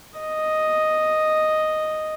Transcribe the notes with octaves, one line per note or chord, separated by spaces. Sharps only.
D#5